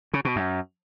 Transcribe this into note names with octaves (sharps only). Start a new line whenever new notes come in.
C#3
B2
F#2